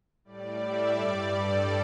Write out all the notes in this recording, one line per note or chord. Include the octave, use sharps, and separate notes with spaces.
A2 G3 D5
E5
G2 G3 D5
A4